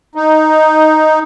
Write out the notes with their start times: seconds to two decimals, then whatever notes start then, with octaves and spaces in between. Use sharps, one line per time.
0.15 D#4